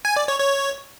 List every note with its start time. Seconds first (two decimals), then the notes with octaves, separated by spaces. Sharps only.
0.05 G#5
0.16 D5
0.28 C#5
0.40 C#5